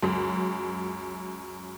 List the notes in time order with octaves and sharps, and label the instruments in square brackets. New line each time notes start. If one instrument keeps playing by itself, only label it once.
[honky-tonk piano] C#2 F#2